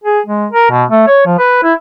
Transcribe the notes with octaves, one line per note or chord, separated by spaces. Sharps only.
G#4
G#3
A#4
B2
A3
C#5
F3
B4
E4